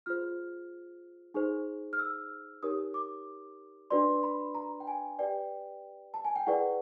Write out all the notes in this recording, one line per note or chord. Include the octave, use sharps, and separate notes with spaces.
F4 G#4 C5 F6
D#4 G#4 C5
F6
E6
D#4 G4 A#4 C#5 D#6
D6
D4 F#4 B4 D5 C6
B5
A#5
G5
G#5
G4 B4 D5 G5
A5
G#5
G5
E4 G#4 B4 D5 F#5